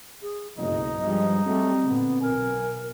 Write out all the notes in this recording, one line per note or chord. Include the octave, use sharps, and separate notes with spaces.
G#4
F#1 B1 G2 F#3 D#4 D#5
G2 F3 G3 G#3
F#3 G3 A3 C4
A#2 D3 B3
B1 B2 A#4 G#5